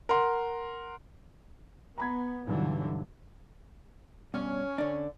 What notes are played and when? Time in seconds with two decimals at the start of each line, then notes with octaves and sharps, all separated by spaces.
0.09 A#4 F#5 C6
1.98 B3 A#5 B5 G#6
2.47 B1 G2 D3 E3 F#3
4.34 G2 B2 C#4
4.78 D3 D4